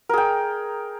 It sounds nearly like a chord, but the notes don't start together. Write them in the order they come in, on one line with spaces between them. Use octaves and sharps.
A#4 G#4 G5